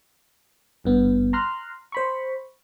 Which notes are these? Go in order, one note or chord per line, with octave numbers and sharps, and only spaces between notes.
G#1 G2 B3
A#5 C6 F6 F#6
C5 B5 C#6